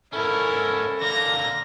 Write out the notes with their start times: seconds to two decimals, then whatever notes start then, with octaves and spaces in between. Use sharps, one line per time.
0.13 G#2 C#4 E4 A4 A#4
1.02 D3 A#3 A#5 A#6